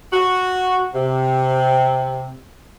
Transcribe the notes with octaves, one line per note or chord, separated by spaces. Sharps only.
F#4
C3